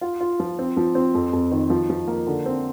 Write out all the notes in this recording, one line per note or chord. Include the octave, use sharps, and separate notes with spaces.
F4
F4
F3
C4
F3
C4
F2
F2
D#3
F3
F3
A#3
D3
C4